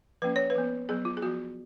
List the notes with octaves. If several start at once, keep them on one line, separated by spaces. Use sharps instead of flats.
F3 A#3 C#4 B4
C#5
B4
F3 B3
F#3 B3 G#4
F4
G#4
F3 B3 F#4